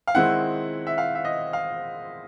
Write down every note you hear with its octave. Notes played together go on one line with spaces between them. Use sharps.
F5
D#3 G#3 C4 E4 F#5
E5
F5
E5
D#5
F5